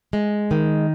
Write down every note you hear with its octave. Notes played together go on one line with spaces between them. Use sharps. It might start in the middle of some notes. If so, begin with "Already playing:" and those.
G#3
D#3